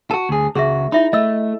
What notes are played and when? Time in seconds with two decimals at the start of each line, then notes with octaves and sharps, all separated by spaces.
0.11 F#4 A4 A5
0.29 D2 G#4
0.55 C#2 F#4 G#4 E5
0.92 D#4 E4 E5 B5
1.13 A3 D#5 E6